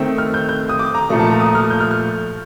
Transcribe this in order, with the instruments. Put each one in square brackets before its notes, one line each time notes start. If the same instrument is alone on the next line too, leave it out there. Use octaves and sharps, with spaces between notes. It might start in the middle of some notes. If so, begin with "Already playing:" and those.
Already playing: [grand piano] D#3 A3 C4
F6
G6
G6
D#6
D6
A#5
A#2 F3 A3 A#5
A5
A#5
D#6
F6
G6
F6
F6